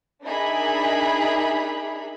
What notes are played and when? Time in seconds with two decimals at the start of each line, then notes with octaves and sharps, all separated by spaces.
0.24 D4 D#4 G#4 A#4 E5 B5